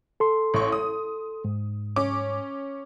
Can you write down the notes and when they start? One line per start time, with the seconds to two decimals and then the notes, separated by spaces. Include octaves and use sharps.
0.20 A4 C6
0.54 A1 C#6
0.72 D#6
1.45 G#2
1.96 C#4 D6